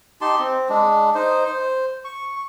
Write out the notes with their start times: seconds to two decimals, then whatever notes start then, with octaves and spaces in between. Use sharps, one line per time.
0.21 D#4 G4 A5 C6
0.39 C4
0.69 G#3 D4
1.15 D#4 C5
1.45 C5
2.05 C#6